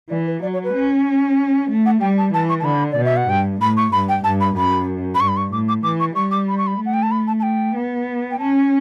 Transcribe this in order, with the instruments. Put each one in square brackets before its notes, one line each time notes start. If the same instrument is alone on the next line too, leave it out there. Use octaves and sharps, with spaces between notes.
[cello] E3 [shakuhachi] D5
[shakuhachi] B4
[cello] F#3 [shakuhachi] D5
[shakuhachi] C#5
B4
[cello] C#4
A3
[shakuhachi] F#5
[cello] G3 [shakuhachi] G5
[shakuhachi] A5
[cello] E3 [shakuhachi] A5
[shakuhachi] C#6
A5
[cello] D3 [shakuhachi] B5
[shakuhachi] D5
[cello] B2
[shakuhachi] E5
F#5
[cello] G2 [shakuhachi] G5
[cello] A2 [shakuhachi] B5
[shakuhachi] C#6
[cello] G2 [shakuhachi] B5
[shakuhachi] G5
[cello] G2 [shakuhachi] A5
[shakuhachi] B5
[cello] F#2 [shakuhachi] B5
[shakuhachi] B5
[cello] G2 [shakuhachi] C#6
[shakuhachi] B5
C#6
[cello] A2 [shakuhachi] D6
[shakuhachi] D6
[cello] E3 [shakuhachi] D6
[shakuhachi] C#6
[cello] G3 [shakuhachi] C#6
[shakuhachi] D6
B5
C#6
B5
[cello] A3
[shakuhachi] F#5
G5
A5
B5
A5
A5
G5
[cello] B3
[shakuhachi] G5
[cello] C#4 [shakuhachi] A5